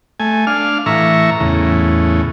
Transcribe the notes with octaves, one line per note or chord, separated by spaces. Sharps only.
A3 G#5
D4 F5 F6
A2 E3 E5 A#5 C#6
E2 A2 C#3